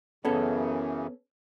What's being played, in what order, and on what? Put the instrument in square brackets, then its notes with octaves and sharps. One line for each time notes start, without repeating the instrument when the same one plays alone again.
[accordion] F#2 C#3 E3 [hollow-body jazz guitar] B3 C#4 A4